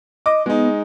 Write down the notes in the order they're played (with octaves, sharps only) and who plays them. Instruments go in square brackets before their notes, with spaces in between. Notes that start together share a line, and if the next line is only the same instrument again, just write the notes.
[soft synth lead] D#5 [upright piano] D6
[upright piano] G#3 D#4 [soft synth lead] B3